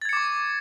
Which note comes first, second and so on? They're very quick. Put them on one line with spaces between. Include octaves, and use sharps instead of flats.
A6 G#6 C#7 D6 C#6